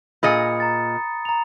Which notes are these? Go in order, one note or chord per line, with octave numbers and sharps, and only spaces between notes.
A#2 G#4 D#5 B5 D#6 C#7
A#5 A6
A#5 F7